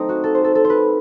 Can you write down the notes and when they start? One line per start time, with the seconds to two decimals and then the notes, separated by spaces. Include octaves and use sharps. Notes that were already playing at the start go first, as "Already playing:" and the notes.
Already playing: A3 C4 D#4
0.09 F#4
0.24 A4
0.35 C5
0.44 A4
0.55 A4
0.65 C5
0.70 B4